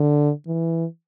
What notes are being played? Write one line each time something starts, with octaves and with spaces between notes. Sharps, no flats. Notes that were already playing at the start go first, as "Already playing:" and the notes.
Already playing: D3
E3